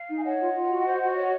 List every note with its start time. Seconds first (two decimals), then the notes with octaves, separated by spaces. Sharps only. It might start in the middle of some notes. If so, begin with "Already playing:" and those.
Already playing: F5
0.09 D#4
0.17 G#5
0.23 C#5 D#5 F#5
0.39 F4
0.55 F4
0.70 F#4
0.86 C5
1.01 F#4
1.16 C#5